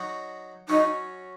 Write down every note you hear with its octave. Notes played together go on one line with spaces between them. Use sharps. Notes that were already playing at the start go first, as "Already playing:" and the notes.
Already playing: F#3 D#4 F#4
F#3 C#4 D#4